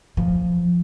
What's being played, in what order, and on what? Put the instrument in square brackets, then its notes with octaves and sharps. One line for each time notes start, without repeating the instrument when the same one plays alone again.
[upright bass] F3